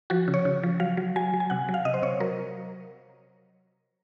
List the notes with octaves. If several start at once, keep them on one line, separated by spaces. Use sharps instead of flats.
F3 F#4
C#3
C#5
C#3
F3
F#3 F5
F#3
F#3 G#5
F#3
G#5
C3 F#5
F#3
F5
C3 D#5
C5
C3 C#5
F#3 A#4